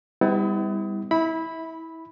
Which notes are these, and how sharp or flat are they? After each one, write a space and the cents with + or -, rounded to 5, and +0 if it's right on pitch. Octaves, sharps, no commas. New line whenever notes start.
G3 +25 B3 +40 E4 -30
E4 -25 B5 +0